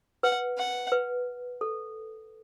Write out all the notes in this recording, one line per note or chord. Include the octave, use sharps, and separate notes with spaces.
B4 F#5
F#5
B4
A4